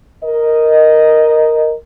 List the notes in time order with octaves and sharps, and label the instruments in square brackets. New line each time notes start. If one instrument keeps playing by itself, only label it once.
[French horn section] A#4 D#5